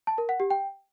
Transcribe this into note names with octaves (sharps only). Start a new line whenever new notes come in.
A5
A#4
F#5
G4
G5